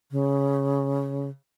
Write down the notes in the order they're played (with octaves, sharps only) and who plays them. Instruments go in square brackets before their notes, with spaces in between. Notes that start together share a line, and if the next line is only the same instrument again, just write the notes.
[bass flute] C#3